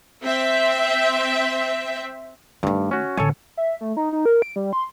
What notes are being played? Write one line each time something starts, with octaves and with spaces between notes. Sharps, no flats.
C4 E5
G2 D#3 A3
C#4 F#4
A1 D3 A4 C#5 G#5
E5
A3
D#4
D#4
A#4
D7
G3
C6